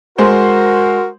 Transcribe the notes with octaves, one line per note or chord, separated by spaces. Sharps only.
G#3 F#4 A#4 C5